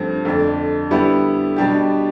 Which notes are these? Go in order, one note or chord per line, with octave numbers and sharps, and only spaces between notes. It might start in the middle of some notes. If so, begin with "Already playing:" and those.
Already playing: G2 F3 A3 C4
F2 D3 A3 D4
D3 G3 B3 E4 G4
B2 G3 D4 G4